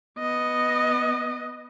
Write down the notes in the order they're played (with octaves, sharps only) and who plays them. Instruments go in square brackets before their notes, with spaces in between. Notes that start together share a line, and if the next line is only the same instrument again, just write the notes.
[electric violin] B3 D#5